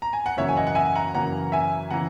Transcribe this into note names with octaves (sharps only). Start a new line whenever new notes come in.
A#5
G#5
F#5
F#2 C#3 E3 A#3 C#5 E5
G#5
D#5 F#5
F#5
E5 G#5
F#5 A#5
F#2 C#3 E3 A#3 F#5 A#5
E5 G#5
C#3 E3 F#5 A#5